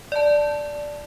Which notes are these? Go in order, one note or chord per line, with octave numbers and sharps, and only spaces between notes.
D5 A5